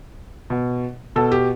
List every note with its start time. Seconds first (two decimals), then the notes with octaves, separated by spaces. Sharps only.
0.50 B2
1.16 B2 A4
1.32 G4